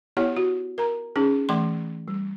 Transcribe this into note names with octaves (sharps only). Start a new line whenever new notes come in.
B3 E4 G4 C#5 F#5
F#4
A#4 A#5
C#4 D#4 G#4
E3 A3 C6
G3